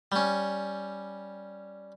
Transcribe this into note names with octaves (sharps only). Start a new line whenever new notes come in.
G3 C#4